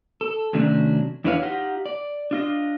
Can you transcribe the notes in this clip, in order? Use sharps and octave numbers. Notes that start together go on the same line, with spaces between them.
A4
C3 D#3 F#3 A3 C#4 D4
E2 D4 E4 B4 C#5 F5
D#4 F4 G4 F#5
D5
D4 F4 D#5